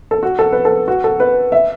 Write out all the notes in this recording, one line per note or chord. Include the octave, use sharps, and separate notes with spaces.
A4
F#4
A4
B4
A4
F#4
A4
B4
E5